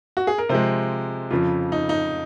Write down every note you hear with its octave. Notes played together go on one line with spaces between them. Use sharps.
F#4
G#4
A#4
C3 F3 G#3 C5
F2 C#3 F3 F4
D#4
D#4